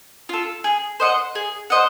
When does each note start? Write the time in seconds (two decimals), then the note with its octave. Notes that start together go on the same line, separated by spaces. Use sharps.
0.29 F4 A4
0.64 G#4
1.00 C5 D#5 F#5
1.35 G#4
1.70 C5 D#5 F#5